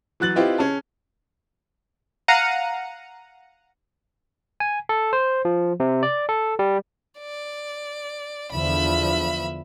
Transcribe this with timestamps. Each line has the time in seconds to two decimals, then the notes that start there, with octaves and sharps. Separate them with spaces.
0.20 E3 F#3 F#6 A6 F#7
0.35 C4 E4 F4 G4 B4 D#5
0.58 C#4 G#4 A5
2.28 F5 F#5 A#5 C#7 D#7
4.60 G#5
4.89 A4
5.13 C5
5.45 F3
5.80 C3
6.03 D5
6.29 A4
6.59 G3
7.20 D5
8.52 E2 D3 F3 E5 B5